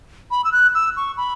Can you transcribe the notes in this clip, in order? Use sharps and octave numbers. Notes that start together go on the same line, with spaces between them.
B5
E6
F#6
E6
C#6
B5